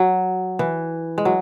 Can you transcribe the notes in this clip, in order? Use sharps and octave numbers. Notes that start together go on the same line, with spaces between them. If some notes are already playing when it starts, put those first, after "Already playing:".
Already playing: F#3
E3
G#3
F#3